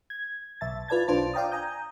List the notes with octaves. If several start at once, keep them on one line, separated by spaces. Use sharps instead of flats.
G#6
B1 E5 A5 A6
F4 B4 D5 A5 G#6 A6
B1 D4 F4 C5 A5 A6
D5 F5 G5 A#5 D#6
G#5 A#5 D#6 G6